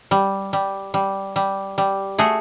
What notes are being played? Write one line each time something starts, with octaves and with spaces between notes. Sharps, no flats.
G3
G3
G3
G3
G3
A3 F#4 G#4